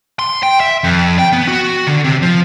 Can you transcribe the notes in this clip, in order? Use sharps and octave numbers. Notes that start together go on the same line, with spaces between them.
C6
G5
E5
F2
G5
B3
F#4
D3
C3
F3